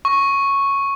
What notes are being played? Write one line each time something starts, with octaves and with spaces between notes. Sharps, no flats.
C#6